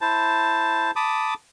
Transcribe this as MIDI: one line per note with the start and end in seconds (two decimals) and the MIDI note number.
0.01 0.91 64
0.01 0.91 72
0.01 0.91 81
0.96 1.34 81
0.96 1.34 83
0.96 1.34 86
0.96 1.34 87